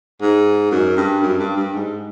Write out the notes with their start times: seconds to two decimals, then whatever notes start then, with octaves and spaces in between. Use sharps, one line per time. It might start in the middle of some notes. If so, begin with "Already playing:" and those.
0.21 G#2
0.71 F#2
0.97 G2
1.23 F#2
1.39 G2
1.57 G2
1.74 G#2